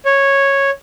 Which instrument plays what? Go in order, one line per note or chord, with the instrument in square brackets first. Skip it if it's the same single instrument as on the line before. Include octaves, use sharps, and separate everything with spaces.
[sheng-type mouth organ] C#5